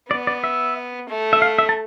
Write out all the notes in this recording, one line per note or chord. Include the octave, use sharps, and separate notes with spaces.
B3 D5
D5
E5
A3
E5
F5
E5
A5